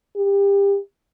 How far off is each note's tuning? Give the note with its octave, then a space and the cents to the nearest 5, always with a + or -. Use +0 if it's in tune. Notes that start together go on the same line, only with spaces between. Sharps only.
G4 +25